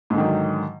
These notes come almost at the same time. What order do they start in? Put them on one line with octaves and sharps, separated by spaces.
G#2 D3 D#3 F#3